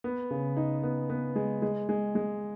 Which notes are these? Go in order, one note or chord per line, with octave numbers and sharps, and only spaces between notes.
B3
C#3
D#4
B3
B3
G#3
G#3
G#3
G#3